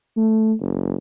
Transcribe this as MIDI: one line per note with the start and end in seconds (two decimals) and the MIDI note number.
0.17 0.53 57
0.61 0.95 30